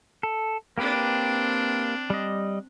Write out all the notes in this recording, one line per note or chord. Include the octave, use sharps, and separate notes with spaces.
A4
A#3 C4 D4 G4 B4
G3 D#5